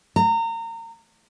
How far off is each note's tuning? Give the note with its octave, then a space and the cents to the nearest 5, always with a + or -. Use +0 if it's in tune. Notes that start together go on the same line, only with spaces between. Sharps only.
A#5 -30